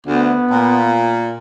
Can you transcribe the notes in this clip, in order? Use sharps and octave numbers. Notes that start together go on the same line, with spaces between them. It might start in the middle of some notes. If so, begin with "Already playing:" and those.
D2 B3
A#2